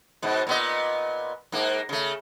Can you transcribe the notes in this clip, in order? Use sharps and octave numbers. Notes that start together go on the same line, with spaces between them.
G#2 B2
A#2 B3 D#5
G#2 A#3
C#3 A3